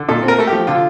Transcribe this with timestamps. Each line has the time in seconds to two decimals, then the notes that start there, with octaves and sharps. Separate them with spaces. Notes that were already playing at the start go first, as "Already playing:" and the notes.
Already playing: D3
0.09 A#2 A4
0.23 C4
0.28 A#4
0.38 A3 A4
0.47 G4
0.53 F3
0.67 D3 F4